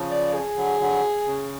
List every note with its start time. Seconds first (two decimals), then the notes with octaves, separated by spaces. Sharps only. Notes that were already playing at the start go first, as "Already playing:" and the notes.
Already playing: C#3 F3
0.11 D5
0.34 G#4
0.57 D3 F#3
0.80 D3 F#3
1.27 C#3